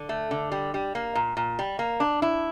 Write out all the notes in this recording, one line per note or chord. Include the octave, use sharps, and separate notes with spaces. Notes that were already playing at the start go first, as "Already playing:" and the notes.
Already playing: D3
A3
D3
G3
G3
A#3
A#2
A#2
G3
A#3
D4
E4